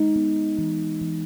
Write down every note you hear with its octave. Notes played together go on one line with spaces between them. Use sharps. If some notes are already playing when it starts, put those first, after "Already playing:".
Already playing: G#3 D#4
B3
E3
E3